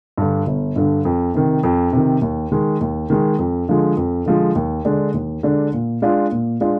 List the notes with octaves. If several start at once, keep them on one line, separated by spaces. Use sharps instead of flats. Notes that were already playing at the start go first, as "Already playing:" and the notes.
G2 D3
G1
G2 D3
F2
C3 D#3
F2
C3 D#3
D#2
D#3 G#3
D#2
D#3 G#3
F2
D3 F3 G#3
F2
D3 F3 G#3
D#2
D3 G#3 D4
D#2
D3 G#3 D4
A#2
G#3 D4 F4
A#2
G#3 D4 F4